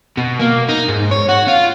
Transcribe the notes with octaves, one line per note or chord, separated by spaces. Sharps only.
B2
A#3
D#4
G#2
C#5
F#4
F4